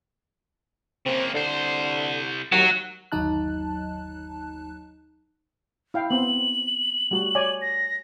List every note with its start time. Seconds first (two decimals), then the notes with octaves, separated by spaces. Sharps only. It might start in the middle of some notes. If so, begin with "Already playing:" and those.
1.06 C#3 A#3 C4
1.34 C2 D3 C5
2.52 D#2 F#3 F#4
3.12 G1 D#2 F#3 D#4 A5 F#6
5.94 E4 F5 G5
6.10 B3 C4 F#7
7.11 G3 A3 F#4
7.35 C#5 D5 G#5
7.62 A#6